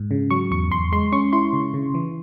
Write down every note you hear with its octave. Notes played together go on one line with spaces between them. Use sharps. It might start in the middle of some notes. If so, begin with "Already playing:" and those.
Already playing: G#2
C#3
F#3 C#6
E2 C#6
E2 C6
G#3 C6
C#4 C#6
E4 C6
C#3
C#3
E3